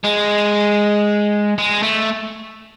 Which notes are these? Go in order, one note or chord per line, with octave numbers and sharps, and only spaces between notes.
G#3
G#3
A3